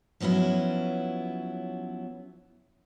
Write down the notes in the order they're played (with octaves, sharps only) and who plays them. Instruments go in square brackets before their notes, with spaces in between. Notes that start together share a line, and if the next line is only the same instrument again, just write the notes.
[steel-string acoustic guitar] F3 F#3 B3 C#4 E4